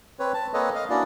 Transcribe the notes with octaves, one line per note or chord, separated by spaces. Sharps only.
C4 B4 C#5
A5
A#3 C4 A4 B4 C#5 D#5
D#5 F5
A#3 C#4 D4 E4 F#4 D5